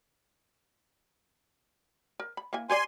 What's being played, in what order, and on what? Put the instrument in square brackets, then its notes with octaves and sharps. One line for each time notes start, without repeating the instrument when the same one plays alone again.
[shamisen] A#4
B5
A#3 E4 G#5
[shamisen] G4 C#5 D5 [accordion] G#5 C6